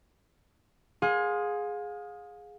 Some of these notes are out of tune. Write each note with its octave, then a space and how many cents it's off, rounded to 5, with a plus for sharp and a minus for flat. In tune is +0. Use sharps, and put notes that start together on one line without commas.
G#4 +0 F5 +35 C6 +0